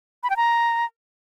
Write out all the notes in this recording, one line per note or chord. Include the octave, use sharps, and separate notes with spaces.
B5
G5
A#5